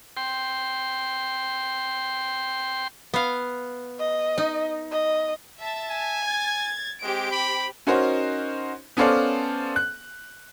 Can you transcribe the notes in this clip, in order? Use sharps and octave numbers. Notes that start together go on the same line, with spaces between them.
G5 C6
B3 F5
D#5
D#4
D#5
E5 A5
G#5
G#6 A6
G#3 C4 G4 D7
B5
C#4 D#4 F#4 A#4 C5
B3 C#4 A4 C5 D5 F5
F#6